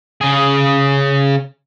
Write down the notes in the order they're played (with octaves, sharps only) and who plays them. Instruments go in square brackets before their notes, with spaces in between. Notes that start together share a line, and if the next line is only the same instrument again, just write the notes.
[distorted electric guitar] C#3 G#4